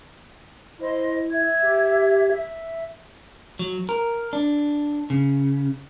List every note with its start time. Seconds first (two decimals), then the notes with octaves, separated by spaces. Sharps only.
0.79 E4 C5 D#5
1.31 E5 G#6
1.62 G4
2.30 E5
3.59 F#3
3.89 A#4
4.33 D4
5.10 C#3